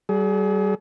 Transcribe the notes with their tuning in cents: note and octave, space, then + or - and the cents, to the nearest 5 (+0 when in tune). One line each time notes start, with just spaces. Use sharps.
G3 -30 G#4 +35